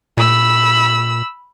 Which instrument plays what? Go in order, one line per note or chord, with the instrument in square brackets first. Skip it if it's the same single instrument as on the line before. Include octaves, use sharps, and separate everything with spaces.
[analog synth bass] A#2 [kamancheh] B5 E6